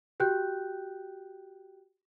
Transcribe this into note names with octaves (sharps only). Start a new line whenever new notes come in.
F#4 G4 G5 F#6 G6